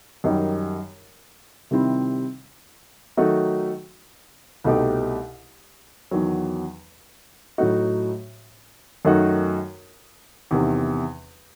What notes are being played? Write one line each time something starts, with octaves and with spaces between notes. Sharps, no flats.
F#2 D#3 G3 D#4 G4
C3 D#3 G3 C4 E4
D#3 F#3 A3 D#4 F#4
C2 B2 A3 D#4 G4
E2 D#3 F#3
A2 F#3 A3 D#4 F#4
F#2 D#3 A3 D#4 F#4
E2 C3 D#3